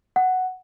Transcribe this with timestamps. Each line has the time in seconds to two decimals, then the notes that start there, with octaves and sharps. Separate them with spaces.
0.16 F#5